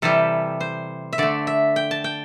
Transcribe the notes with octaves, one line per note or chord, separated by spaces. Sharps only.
C3 E3 G3 A4
C5
E5
D3 A3 D5
E5
G5
A5
G5